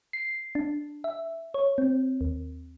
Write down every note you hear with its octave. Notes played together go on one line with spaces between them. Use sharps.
C7
D4
E5
C#5
C4
D#2